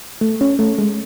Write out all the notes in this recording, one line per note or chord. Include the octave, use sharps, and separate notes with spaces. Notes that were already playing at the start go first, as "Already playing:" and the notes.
A3
C#4
A3
G#3